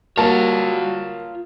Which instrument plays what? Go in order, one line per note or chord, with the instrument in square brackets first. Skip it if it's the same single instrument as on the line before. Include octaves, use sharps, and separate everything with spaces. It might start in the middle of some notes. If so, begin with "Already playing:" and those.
[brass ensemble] G3 F#4 [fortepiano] A#3 [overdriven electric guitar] F4 C#5 [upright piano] A5